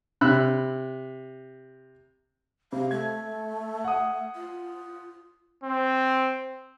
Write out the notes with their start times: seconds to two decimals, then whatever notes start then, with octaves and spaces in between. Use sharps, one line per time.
0.21 C3 B5 E6 F#6
2.72 C3 F5
2.91 A3 G#6
3.84 F#5 D#6
4.35 F4
5.64 C4